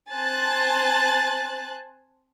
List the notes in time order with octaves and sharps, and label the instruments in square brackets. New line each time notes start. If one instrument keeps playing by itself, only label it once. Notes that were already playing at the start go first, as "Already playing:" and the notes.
[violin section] C4 C5 G#5 A5 F#6 A6